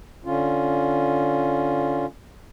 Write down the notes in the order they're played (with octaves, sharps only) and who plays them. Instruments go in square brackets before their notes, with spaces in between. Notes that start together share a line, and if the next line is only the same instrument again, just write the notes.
[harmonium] D3 C#4 F4